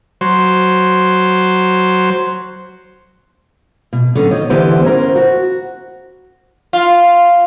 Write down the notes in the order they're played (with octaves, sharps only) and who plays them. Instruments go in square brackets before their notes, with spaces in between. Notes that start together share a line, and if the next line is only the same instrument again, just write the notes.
[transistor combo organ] F#3 C5
[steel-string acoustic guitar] B2
D3 F#3 B3 C#4
D#3 C#5 D#5
D3 E3 B3 G4 B4 C5
C#4 E4 A#4 C5
F#4
[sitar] F4